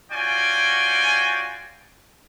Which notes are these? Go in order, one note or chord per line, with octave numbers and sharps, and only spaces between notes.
C#4 F4 F#4 D5 G5 G#5